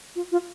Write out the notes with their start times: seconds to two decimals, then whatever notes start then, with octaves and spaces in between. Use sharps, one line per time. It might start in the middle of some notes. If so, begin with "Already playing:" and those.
0.16 F4
0.32 F4